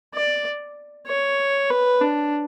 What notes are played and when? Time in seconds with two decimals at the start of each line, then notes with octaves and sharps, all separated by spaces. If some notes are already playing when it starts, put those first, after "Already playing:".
0.14 D5
1.07 C#5
1.70 B4
2.01 D4